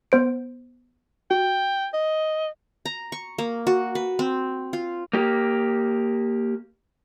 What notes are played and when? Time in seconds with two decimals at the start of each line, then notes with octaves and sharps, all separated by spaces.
0.12 B3 C5 D7
1.31 F#4 G5
1.94 D#5
2.85 A#5
3.12 C#6
3.38 A#3
3.67 F#4
3.95 B4
4.19 C4
4.73 F4
5.13 A#3 G4